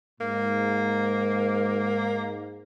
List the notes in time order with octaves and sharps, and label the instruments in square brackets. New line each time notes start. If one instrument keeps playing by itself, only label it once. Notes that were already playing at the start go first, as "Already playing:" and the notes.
[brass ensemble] G#2 [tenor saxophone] A#3